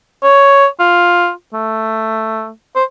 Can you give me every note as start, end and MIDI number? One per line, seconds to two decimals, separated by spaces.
0.23 0.66 73
0.80 1.30 65
1.54 2.49 57
2.76 2.84 72